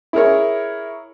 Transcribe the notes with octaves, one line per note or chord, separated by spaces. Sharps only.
E4 G#4 A#4 C#5